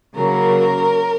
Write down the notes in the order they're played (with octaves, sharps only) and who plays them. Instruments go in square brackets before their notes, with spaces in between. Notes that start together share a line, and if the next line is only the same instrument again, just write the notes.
[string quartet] C#3 F#3 A#3 A#4